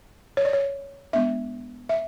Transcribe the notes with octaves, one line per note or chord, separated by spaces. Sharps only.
C#5
D5
C#5
G#3 B3 D4 E5
E5